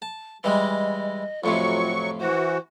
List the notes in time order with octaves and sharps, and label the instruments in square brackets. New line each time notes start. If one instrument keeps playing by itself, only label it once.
[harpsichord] A5
[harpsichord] E3 G3 G#3 [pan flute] D#5
[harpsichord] F2 A2 C3 [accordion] F#3 C#6 [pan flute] F4
[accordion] E3 F#4 [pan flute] C5